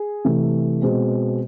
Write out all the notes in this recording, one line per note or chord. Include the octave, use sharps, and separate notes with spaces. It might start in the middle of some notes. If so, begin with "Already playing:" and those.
Already playing: G#4
C3 E3 A3
B2 G#3 C4